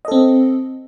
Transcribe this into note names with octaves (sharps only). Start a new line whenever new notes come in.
C4 A4 D#5